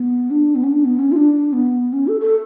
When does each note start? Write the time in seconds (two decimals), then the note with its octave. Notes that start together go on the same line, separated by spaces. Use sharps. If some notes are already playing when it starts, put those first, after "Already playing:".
Already playing: B3
0.30 D4
0.55 B3
0.64 C#4
0.72 D4
0.85 B3
0.99 C#4
1.12 F4
1.16 D4
1.53 B3
1.93 C#4
2.08 A4
2.21 A4